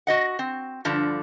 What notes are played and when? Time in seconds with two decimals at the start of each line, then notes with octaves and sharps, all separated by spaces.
0.07 F#4 D#5 F#5
0.39 C4
0.85 G2 D3 F3